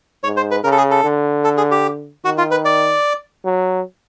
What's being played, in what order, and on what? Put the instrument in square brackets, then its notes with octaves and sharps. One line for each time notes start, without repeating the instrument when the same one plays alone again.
[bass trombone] G#2 [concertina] C#5
[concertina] C5
B4
[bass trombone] C#3 [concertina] A#4
[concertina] A4
G#4
A4
[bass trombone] D3
[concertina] A4
G#4
G4
[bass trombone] D#3 [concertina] F#4
[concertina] F4
B4
D5
[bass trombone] F#3